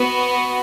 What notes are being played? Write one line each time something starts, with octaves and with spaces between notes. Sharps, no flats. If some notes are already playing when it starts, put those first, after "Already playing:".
Already playing: B3 F#4